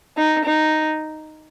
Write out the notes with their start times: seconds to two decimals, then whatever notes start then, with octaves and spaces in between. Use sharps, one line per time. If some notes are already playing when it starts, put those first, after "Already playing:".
0.16 D#4
0.45 D#4